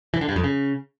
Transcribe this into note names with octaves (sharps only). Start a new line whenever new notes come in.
E3
D3
G2
F2
C#3